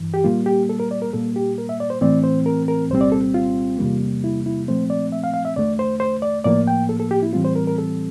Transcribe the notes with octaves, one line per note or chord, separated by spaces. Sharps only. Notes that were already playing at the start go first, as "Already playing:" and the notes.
Already playing: G2 E3
G4
A#2 G3 A#3 F4
G4
A4
A#4
D5
A#4
A#2 G3 A#3 A4
G4
A#4
E5
D5
C5
A2 E3 A3 C4 D5
C5
A#4
A#4
C2 A#2 G3 C4 C5
D5
A4
F4
E2 C3 G3 A#3
E4
E4
A#2 F3 A3 C4 C5
D5
E5
F5
F5
E5
E2 D3 A3 D5
C5
C5
D5
A2 F3 A#3 D5
G5
A4
A4
G4
E4
A2 E3 G3 C4 F4
C5
A#4
A#4
A4